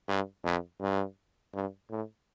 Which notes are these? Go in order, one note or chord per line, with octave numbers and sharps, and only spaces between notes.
G2
F2
G2
G2
A2